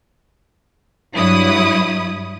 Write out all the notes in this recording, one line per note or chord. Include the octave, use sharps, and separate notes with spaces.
G2 F#3 E4 D#6